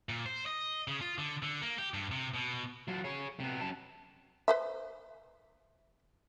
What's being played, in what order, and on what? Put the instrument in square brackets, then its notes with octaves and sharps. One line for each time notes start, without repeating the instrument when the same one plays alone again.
[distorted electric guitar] A#2
C5
D#5
C#3
F4
D3
D3
A#3
G4
G2
C3
B2
F#3 F4
G#4 C#5
C3 B3
F#2 A5
[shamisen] B4 C5 E5